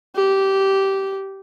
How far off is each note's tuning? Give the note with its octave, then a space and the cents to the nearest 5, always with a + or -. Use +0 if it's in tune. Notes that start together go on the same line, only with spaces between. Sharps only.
G4 -15